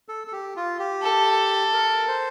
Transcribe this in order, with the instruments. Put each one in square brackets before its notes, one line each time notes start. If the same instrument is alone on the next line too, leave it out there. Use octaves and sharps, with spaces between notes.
[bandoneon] A4
A4
G4
F4
G4
[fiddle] A4
[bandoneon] A#4
C5